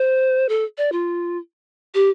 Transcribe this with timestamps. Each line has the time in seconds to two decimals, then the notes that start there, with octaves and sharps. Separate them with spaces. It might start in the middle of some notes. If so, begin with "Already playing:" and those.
Already playing: C5
0.49 A4
0.78 D5
0.92 F4
1.94 G4